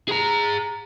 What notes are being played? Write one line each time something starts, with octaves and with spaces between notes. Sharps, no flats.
G#4 A#5